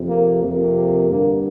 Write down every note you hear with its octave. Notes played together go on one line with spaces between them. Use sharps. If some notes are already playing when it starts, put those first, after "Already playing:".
Already playing: F2 C3
A#3
F2 C3 A#3
G2 D3 A#3